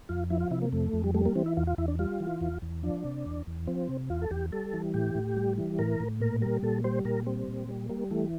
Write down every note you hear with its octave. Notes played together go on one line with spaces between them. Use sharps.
F2 F4
F3 E4
F4
C3 E4
A#3
F2 A3
F2
G3
G3 A3
A#3
E3 C4
E4
E2 F4
F4
E2 E4
D4
G3 F4
E3
E2
E2
F3 D4
C3
E2
E2
F3 C4
C3
E2 F4
A4
E2 G4
G3 A4
E3
A2 G4
A2
G3
E3
A2 A#4
A2
A#2 A#4
G3 A#4
A#2 A4
G3 C5
A#2 A#4
G3 C4
A#2
G3
G3 A#3
E3 A3